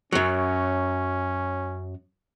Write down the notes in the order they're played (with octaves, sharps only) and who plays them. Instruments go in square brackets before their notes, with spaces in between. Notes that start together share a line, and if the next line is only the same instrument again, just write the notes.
[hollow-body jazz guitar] F#2 F#3 [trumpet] C#4